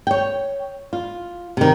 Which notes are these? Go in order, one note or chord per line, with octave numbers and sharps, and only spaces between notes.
C#5 G5
F4
C3 D#3